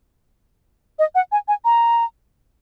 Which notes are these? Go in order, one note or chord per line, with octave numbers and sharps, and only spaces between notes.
D#5
F#5
G#5
G#5
A#5